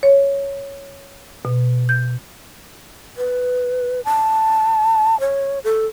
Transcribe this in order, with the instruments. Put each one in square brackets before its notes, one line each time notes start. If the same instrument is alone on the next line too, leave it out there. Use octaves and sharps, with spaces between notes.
[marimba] C#5
B2
G6
[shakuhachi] B4
A5
C#5
A4